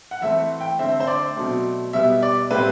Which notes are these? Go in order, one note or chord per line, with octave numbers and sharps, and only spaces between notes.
F#5
E3 A3 C4 E5
G5
D3 A3 C4 E5
C5
D5
B2 F#3 A3 C4
B2 G3 B3 E5
D5
A2 G3 C4 B4